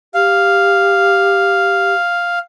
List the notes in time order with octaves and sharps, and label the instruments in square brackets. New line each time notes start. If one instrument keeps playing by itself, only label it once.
[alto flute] G4 [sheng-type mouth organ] F5